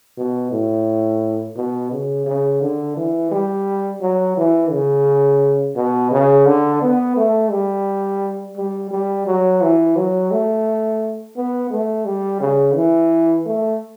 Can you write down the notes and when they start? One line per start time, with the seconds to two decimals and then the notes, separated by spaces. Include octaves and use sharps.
0.17 B2
0.52 A2
1.56 B2
1.92 C#3
2.26 C#3
2.62 D3
2.97 E3
3.32 G3
4.01 F#3
4.37 E3
4.71 C#3
5.76 B2
6.11 C#3
6.46 D3
6.81 B3
7.17 A3
7.51 G3
8.57 G3
8.91 G3
9.27 F#3
9.62 E3
9.96 F#3
10.31 A3
11.36 B3
11.71 A3
12.05 G3
12.40 C#3
12.75 E3
13.46 A3